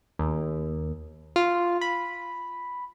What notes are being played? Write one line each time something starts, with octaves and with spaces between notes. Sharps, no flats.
D#2
F4
B5